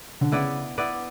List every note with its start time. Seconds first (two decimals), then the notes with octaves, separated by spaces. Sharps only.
0.21 D3
0.32 C#3 B3 E4 B4 D5
0.78 B3 E4 B4 D5